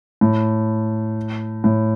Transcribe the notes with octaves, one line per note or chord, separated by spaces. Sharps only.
A2
A2